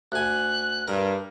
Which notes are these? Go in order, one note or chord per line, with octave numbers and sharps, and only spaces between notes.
D2 G#5 F#6
G2 A#4